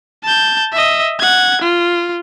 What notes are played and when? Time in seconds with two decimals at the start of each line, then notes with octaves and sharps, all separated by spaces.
0.24 A5 G6
0.73 D#5 E5
1.20 F#5 G#6
1.62 F4